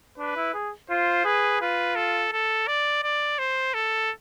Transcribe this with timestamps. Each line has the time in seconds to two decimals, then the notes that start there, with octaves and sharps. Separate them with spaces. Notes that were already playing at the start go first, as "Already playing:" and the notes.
0.18 D4 B4
0.36 E4
0.54 G#4
0.90 F4 C5
1.25 G#4 B4
1.61 F4 B4
1.96 A4
2.32 A4
2.68 D5
3.03 D5
3.39 C5
3.74 A4